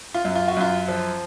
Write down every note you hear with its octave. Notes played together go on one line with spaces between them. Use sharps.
F4
F#2
F4
F#4
F#2 F4
F3